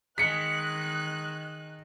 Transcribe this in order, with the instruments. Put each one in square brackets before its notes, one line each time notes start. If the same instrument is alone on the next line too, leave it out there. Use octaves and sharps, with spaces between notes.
[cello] D#3 D#4 [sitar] G#3 [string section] F#6 [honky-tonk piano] B6 C#7